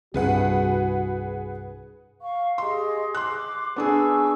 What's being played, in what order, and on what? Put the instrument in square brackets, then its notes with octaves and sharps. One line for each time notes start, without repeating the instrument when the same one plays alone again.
[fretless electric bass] C2 G2 [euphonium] F#4 [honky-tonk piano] G#4 B4 F#5
[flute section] F5 C#6
[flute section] G4 G#4 D#5 [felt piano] C6
[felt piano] C6 F#6 [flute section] D6
[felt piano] B3 D4 G#4 [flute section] G#5 C#6 E6